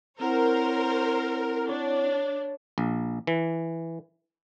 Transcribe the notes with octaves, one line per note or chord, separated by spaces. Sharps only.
C4 E4 A#4 C5 C#5 F#5
D4 C#5
A#1
E3